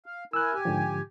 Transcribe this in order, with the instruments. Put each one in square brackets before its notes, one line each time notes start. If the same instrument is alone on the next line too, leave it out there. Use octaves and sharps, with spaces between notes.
[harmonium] F5
[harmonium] E4 A#4 G#5 [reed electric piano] E6 F#6
[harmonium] G4 G#5
[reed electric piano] G#2 D3 F3